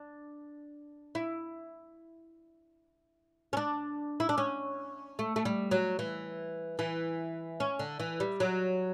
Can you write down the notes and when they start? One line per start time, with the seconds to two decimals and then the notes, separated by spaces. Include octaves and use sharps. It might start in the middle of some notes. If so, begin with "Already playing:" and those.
Already playing: D4
1.15 E4
3.53 C#4
3.57 D4
4.20 E4
4.29 D4
4.38 C#4
5.19 A3
5.36 A3
5.45 G3
5.71 F#3
5.99 E3
6.79 E3
7.60 C#4
7.79 D3
8.00 E3
8.20 G3
8.40 F#3